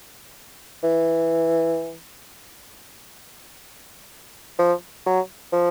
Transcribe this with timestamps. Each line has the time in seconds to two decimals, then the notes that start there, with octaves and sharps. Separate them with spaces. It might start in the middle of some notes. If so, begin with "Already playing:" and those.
0.84 E3
4.59 F3
5.06 F#3
5.52 F3